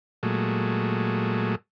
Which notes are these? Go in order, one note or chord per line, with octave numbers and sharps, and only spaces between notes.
A#2 F#3 G#3 A3